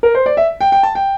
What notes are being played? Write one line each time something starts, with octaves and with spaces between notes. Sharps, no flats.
A#4
C5
D5
E5
G5
G5
A5
G5